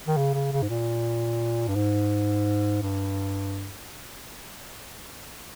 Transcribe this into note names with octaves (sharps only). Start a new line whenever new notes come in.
D#3
C#3
C#3
C#3
G#2
A#2
G2
G#2
G2